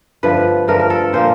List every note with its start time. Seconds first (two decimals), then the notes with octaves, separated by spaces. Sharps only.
0.23 G2 D3 F3 A3 B4
0.68 G2 D3 F3 A3 A#4
0.80 A#4
0.90 A4
1.13 A#2 F3 A#3 C5